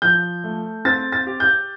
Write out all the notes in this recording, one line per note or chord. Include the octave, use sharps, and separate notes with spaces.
F3 G6
A3
C4 A6
A6
G4
G6